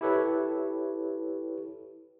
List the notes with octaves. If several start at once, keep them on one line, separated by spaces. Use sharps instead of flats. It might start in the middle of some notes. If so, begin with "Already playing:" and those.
E4 G4 A4 B4 C#5